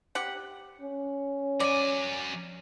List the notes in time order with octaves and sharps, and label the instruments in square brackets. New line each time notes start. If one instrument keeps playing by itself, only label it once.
[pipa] G4 F#5
[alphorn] C#4
[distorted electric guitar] F#3 G#5 [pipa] D5